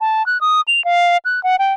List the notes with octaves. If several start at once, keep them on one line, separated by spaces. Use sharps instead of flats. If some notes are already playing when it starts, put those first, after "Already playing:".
A5
F#6
D#6
F7
F5
F#6
F#5
G5